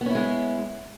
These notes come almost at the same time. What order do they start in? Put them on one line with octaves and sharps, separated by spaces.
B3 C#4 E4 G#3